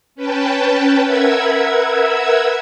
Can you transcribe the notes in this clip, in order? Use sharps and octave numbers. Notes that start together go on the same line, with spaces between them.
C#4 B4 G5 A5
A#4 B4 E5 F#5 E6 G#6